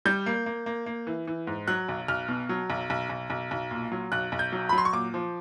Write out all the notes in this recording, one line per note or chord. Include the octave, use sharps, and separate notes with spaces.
G3 G6
A#3
A#3
A#3
A#3
E3
E3
G#2
F#3 F#6
B1
B1 F6
B2
F#3
B1
B1
B1
B1
B1
A#2
F#3
B1 F#6
B1
G6
F#3
B5
F#3
C6
C#6
A#2 D6
F3